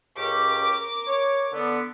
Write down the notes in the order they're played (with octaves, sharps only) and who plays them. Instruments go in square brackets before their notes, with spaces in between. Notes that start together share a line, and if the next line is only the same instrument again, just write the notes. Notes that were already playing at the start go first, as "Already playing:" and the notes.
[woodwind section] C#2 C#4 G4 [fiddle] A#4 D6
[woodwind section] C#5
D3 B3